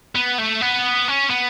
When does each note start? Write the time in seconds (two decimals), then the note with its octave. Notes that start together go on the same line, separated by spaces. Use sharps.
0.15 B3
0.38 A3
0.61 B3
1.08 C#4
1.30 B3